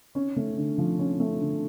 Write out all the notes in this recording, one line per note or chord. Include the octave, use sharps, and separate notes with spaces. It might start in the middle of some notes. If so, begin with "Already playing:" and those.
C#4
A3
D3
F3
C#4
A3
D3